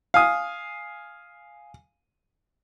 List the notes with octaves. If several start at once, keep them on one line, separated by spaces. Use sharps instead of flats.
F5 G#5 D#6